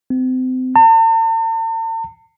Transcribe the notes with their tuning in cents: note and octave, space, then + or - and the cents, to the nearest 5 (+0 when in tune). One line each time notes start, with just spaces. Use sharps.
C4 -35
A5 +45